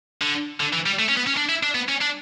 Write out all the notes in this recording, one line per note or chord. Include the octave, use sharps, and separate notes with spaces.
D3
D3
E3
G3
A3
C#4
B3
C#4
D4
E4
D4
B3
C#4
D4